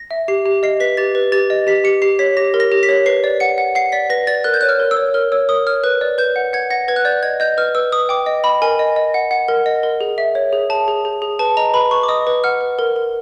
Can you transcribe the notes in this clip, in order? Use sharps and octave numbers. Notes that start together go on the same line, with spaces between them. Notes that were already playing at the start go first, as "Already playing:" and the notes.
Already playing: A#6
E5
G4 C7
G4
D#5 C7
B4 B6
G4 A6
B4
G4 A6
D#5
G4 B6
G4 C#7
G4 C7
C#5 B6
G4 A#6
A#4
A#6
G4
B6
C#5
B4 C7
D5
F#5 C#7
F#5
F#5 C7
D5 B6
B4 A#6
D5 A6
A#4 F#6
G6
C#5 F#6
F6
A#4
E6
C#5
A#4 F6
C#5 E6
A#4 D#6
C#5 F6
B4 F#6
D5
B4 G6
F#5
F#5 G#6
F#5 A#6
B4 G#6
F#6
D5 G6
D#5 G#6
D#5 G6
B4 F6
B4 E6
B4 D#6
G5 D6
D#5
D#5 B5
A#4 G#5
D#5
D#5
F#5
F#5
A#4
D#5
A#4
G#4
E5
C#5
G#4
G#4 A5
G#4
G#4
G#4
B4 A5
D#5 A#5
B4 B5
B4 C#6
D6
D#5 D#6
B4
F#5 F6
B4
A#4
A#4